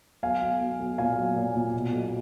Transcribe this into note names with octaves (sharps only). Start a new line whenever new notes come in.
B1 F5 G#5
B1
B1
B1
A#2 F5 G#5
F#3
A#2
A#2
B2
B1